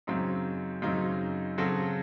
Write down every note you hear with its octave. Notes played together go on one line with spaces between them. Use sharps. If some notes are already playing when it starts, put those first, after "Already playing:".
F#2 C#3 F#3 C4 D#4
F#2 C#3 F#3 C4 D#4
C#3 F#3 C4 F#4 A4